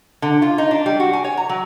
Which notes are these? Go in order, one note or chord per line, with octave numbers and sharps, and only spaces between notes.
D3
F4
D#4
D4
G3
F#4
G#5
C#5
A#5
F#3